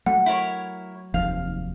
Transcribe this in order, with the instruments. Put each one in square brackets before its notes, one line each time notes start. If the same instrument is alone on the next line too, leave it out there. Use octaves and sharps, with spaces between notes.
[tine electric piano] F#3 [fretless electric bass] A3 [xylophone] F#5
[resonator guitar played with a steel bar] E4 A#4 C#5
[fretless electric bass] F1 D#2 F3 [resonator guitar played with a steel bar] F5